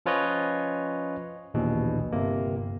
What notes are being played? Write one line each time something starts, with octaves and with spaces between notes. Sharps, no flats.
F3 C#4 F4 B4 C#5 D#5
A#1 D#2 B2 E3
G1 C3 A#3